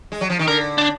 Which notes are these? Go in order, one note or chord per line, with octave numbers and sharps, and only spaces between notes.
G#3
F#3
F3
D#3
D3 A#4
D4